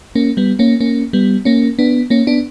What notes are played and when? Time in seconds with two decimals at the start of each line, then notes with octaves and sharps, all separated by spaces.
0.15 A#3 C#4
0.37 G3 B3
0.59 A#3 C#4
0.80 A#3 C#4
1.13 G3 B3
1.45 A#3 C#4
1.79 B3 D4
2.10 A#3 C#4
2.27 B3 D4